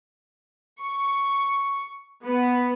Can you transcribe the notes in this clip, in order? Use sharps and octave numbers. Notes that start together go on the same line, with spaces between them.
C#6
B3